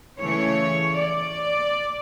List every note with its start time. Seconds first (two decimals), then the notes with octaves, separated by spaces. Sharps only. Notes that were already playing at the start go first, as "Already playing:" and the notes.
0.20 C#3 E3 A3 C#5
0.96 D5